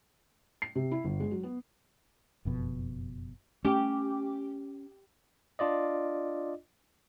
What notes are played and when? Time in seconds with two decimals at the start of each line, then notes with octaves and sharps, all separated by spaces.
0.62 C7
0.75 C3
0.92 E4
1.05 G1
1.20 G#3
1.31 F#3
1.43 B3
2.45 F#1 F2 B2
3.65 A3 C#4 G4
5.59 D4 F4 D5 D#5